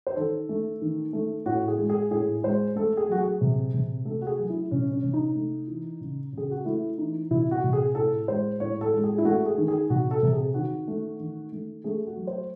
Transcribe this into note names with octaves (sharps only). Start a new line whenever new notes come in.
C5
D#3 A4
A3
D#3
A3
A2 F#4
G#4
G#3
G#4
A2 G#4
G#3 C5
A3 A4
G#4
F#3 F#4
G#4
C3
C3
A3 A4
F#4
G#4
F#3
E4
C3 C#4
C#4
C3
D#4
A3
E3
C#3
C#3 G#4
F#4
A3 E4
E3 D#4
C3 E4
F#4
C3
G#4
A2 A4
G#3 C5
A2 C#5
A4
G#3
G#4
E4
A3 F#4
G#4
D#3
G#4
C3 F#4
A4
C3
G#4
D#3 F#4
A3
D#3
A3
A3 G#4
F#4
F#3
C5